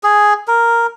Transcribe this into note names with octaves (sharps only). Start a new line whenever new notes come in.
G#4
A#4